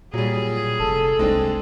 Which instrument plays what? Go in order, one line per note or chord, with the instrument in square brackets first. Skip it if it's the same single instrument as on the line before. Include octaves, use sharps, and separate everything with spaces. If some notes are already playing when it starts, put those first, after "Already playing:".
[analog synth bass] A#2 [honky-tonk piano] F#3 G3 [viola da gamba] G#4
[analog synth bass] F1 [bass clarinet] A4
[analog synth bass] C2 [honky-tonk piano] G#3 C4 D4